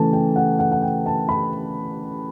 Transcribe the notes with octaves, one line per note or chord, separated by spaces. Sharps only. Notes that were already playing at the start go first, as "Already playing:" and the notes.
Already playing: C#3 E3 A3 A5
G5
F#5
F#5
F#5
G5
A5
B5